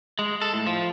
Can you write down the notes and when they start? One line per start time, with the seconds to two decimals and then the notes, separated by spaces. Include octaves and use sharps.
0.19 G#3
0.42 A4
0.54 A2
0.67 F3